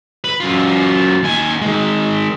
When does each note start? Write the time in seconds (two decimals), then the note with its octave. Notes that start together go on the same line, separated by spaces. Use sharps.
0.24 B4
0.40 F#2 F4
1.23 D#2 G#5
1.62 D#3 G#3